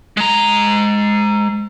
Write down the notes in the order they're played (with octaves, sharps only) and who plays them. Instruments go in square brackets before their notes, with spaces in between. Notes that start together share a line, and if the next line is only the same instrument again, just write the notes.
[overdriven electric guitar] G#3 A#5